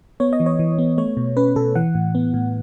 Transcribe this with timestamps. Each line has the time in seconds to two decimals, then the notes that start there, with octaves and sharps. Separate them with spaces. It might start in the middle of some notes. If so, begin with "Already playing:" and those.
0.20 B3 C#5
0.33 D#5
0.40 E3
0.46 C#5
0.59 E3
0.78 B3
0.98 A3 C#5
1.17 B2
1.37 C#4 B4
1.56 B2 A4
1.75 E3 F#5
1.95 A2
2.15 B3
2.34 A2